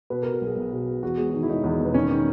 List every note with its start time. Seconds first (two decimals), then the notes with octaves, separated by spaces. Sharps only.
0.10 B2 B4
0.23 A#4
0.25 B2
0.34 A#4
0.41 B1 G#4
0.56 B1
0.72 B2
0.87 B2
1.03 E2 F#4
1.17 E1 G#4
1.30 D#3 F#4
1.43 E4
1.49 E1 D#4
1.64 E2
1.80 E1
1.85 B3
1.94 D#3 C#4
2.11 D#3